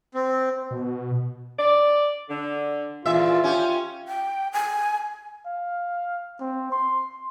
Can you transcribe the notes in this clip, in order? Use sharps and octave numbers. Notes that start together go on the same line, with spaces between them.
C4
B2
D5
D3
E2 A#2 F4 E5
C#4 F4 G4
G5
G#5
F5
C4
C6